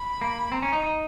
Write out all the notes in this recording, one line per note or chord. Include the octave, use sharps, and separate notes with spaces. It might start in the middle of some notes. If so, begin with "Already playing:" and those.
Already playing: B5
A#3
C4 A#5
C#4
D#4
D#4